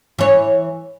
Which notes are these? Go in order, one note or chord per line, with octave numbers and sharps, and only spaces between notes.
E3 C#5